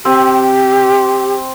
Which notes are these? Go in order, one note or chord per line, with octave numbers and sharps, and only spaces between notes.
C4 G4